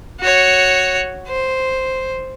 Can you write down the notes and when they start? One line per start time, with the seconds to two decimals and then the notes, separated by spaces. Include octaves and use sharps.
0.20 F#4 C#5
1.28 C5